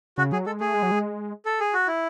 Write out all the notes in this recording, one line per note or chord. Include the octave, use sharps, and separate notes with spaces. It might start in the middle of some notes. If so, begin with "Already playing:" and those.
C#3 F#4
F#3 G#4
G#3 A4
A3 G#4
G#3
F#3
G#3
A4
G#4
F#4
E4